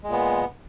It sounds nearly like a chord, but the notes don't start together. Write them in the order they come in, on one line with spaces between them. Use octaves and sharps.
G#3 A#2 B3